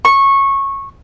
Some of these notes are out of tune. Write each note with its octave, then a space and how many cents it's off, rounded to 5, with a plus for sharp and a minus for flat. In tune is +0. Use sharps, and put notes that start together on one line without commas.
C#6 -15